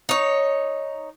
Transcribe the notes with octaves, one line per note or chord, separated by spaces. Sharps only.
D#4 C#5